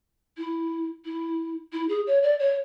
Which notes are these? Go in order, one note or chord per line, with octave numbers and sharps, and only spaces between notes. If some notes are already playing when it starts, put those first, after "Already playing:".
E4
E4
E4
G#4
C#5
D5
C#5